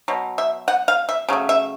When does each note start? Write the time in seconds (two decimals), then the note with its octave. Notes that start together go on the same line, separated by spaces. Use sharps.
0.08 B2 F#3
0.38 E5
0.68 F#5
0.88 F5
1.09 E5
1.29 C#3 F#3 A3
1.49 E5